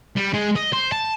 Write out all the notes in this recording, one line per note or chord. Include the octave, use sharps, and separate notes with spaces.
G3
G#3
D#5
C5
A5